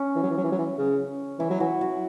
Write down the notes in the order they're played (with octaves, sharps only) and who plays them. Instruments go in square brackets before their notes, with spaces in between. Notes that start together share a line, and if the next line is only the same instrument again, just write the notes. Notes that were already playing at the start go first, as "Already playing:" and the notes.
Already playing: [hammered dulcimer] C#4
[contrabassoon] E3
F#3
E3
F#3
E3
F#3
E3
C#3
[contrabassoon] E3 [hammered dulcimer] E4
[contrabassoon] F#3
[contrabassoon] E3 [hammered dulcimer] F#4
[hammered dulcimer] F#4